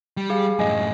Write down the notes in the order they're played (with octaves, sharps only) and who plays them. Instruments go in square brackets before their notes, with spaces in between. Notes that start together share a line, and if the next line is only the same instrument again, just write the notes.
[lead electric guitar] G3
[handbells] G4 G#4 F5
[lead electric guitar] F#2 A2 [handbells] D#5 G#5